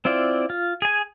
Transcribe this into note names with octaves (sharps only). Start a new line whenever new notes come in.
C4 E4 F4 D5
F4
G#4 G#5